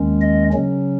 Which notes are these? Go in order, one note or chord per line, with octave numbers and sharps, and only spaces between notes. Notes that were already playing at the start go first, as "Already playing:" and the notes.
Already playing: D#2 D#3 G#3 C#4
D#5
C#3 F#3 C#4